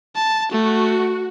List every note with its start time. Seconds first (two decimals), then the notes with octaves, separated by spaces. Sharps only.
0.16 A5
0.52 A3 F#4